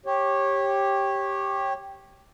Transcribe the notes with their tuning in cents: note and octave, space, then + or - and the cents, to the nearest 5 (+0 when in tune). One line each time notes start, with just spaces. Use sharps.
G4 +0 C#5 -20